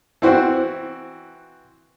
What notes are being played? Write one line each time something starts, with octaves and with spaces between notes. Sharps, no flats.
E3 C4 F#4